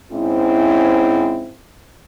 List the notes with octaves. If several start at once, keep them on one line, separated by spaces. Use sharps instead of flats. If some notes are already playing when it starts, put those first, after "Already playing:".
G#2 C4 C#4 E4